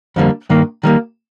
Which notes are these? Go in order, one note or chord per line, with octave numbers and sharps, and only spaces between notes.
F2 D3 G3 A#3
G2 D#3 A#3
D#3 G3 A#3